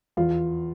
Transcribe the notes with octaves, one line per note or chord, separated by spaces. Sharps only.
E2 F4